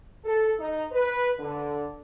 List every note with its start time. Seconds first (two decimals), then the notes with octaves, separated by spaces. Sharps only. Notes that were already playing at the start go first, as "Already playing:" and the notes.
0.24 A4
0.59 D#4
0.92 B4
1.39 D3